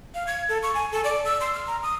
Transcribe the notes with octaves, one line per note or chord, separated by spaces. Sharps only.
F5
G#6
A4
C#6
G#5
A4
D5
E6
C6
F6
A#5
D#6